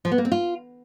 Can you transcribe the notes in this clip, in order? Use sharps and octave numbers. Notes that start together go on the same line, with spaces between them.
F3
B3
A#3
C4
F4